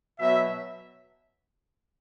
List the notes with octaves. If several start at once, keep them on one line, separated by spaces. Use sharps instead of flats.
B2 F#3 E5